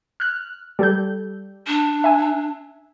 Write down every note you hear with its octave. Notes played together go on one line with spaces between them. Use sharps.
F6 F#6
G3 A4 G6
D4
E5 G#5